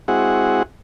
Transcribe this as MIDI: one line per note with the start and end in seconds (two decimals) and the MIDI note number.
0.08 0.63 56
0.08 0.63 60
0.08 0.63 64
0.08 0.63 66
0.08 0.63 68
0.08 0.63 78